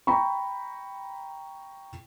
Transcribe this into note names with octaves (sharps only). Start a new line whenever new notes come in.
G5 A#5 B5 C#6